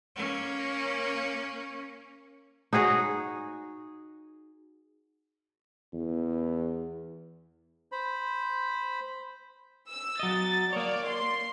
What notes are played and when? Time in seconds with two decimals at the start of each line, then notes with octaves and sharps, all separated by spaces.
0.16 A#3 C#4
2.73 D#4 F#4 G#4 C#5
5.93 E2
7.92 C5 B5
9.90 E6
10.20 F#3 D#5 A6
10.73 A#3 C#5 D5
11.08 C6